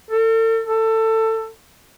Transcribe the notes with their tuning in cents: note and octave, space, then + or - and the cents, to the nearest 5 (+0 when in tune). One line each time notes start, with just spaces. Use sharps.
A4 +40
A4 +20